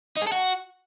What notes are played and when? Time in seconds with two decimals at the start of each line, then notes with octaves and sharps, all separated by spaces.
0.17 D#4
0.22 G#4
0.27 A4
0.32 F#4